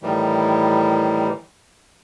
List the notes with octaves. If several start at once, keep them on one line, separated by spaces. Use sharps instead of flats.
A2 D#3 E3 G3